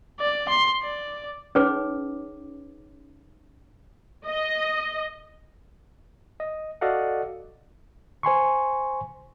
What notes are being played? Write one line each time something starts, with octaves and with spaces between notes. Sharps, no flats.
D5
C6
D5
C#4 D#4 G#4 B4 C#5 D6
D#5
D#5
F#4 A4 D5 D#5 F5 F#5
C5 G#5 C6 C#6